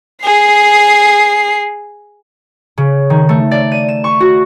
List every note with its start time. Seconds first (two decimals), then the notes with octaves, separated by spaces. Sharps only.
0.24 G#4 C7
2.78 C#3
3.10 D#3
3.29 A3
3.51 D5
3.72 D#7
3.89 E7
4.04 C#6
4.20 F#4